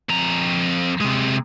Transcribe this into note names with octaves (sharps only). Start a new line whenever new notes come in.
F2 A#5
C3 G#3